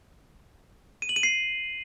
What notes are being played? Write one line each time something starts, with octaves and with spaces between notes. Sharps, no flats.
D#7
F#7
D#7
C7